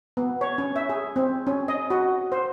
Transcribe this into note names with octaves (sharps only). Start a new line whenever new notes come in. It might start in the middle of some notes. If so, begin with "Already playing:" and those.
B3
C#5
C#4
E5
G#4
C4
C#4
D#5
F#4
C5